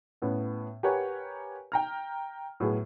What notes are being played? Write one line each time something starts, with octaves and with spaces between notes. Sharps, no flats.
A2 B3 C#4
G4 A#4 B4 C#5 F#5 G#5
G5 A#5 F6
A2 F#3 B3 G#4